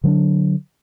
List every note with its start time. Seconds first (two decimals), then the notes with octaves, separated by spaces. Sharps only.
0.04 D3 F#3 B3 D4